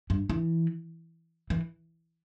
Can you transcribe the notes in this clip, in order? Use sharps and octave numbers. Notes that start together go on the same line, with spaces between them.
G2
E3
E3